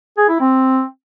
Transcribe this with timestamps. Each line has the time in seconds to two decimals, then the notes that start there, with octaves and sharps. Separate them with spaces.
0.18 G#4
0.29 E4
0.40 C4